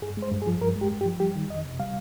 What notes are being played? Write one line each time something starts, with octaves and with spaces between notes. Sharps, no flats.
G2 G#4
G#3
C5
G2
G#4
F3
G2 A#4
G#3
G4
G2
G4
F3
G3 G4
D#3
F2 D#5
C3
G3 F5